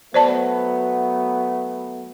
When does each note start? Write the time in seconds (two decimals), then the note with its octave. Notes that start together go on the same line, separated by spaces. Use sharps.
0.14 F#3 A3 B3 C5 D5 A5